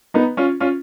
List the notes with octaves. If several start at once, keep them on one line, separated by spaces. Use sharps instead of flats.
B3 D#4
C#4 F4
C#4 F4